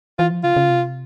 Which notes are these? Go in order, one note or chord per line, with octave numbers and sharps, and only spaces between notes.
E3 F4
F3
C#3 F4
C#3
C3